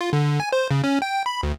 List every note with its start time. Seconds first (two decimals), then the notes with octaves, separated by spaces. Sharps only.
0.01 F4
0.13 D3
0.40 G#5
0.52 C5
0.71 C#3
0.84 C#4
1.02 G5
1.26 B5
1.43 D2